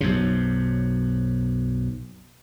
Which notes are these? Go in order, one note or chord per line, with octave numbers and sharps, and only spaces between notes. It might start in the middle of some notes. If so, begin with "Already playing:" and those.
B1 F#2 C3